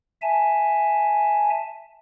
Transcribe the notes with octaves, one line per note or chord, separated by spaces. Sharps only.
E5 G#5 A5